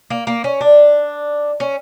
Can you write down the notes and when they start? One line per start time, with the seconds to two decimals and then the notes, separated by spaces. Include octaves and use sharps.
0.10 A#3
0.27 A#3
0.44 C#4
0.61 D4
1.60 C#4